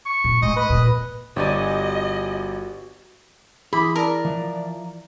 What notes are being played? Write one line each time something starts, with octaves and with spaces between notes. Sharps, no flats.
C#6
A#2
A2 G#3 D#5
B4 D#5
F2 A#2
G1 F#4 G4 D5 D#5 G#5
E3 E4 G#4 B5 C6 D6 D#6
A#4 D5 A5
E3 F3 F5